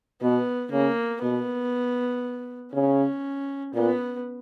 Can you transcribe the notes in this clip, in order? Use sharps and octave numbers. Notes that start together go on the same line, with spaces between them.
B2 B3
C#3 A#3
B2 B3
C#3 C#4
A#2 B3